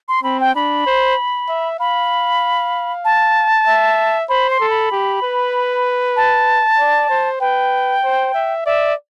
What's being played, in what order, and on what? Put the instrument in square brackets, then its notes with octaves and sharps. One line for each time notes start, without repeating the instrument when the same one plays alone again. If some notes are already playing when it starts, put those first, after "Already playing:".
[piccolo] C6
[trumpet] C4 [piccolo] B5
[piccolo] G5
[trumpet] D4 [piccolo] B5
[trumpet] C5
E5
[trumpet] F5 [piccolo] B5
[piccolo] A5
[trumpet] E5
[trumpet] C5 [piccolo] B5
[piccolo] C6
[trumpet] A4
[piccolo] B5
[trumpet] G4
B4
[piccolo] A5
[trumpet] D5
C5
[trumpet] B4 [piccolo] G5
[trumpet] C5
E5
[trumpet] D5 [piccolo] E5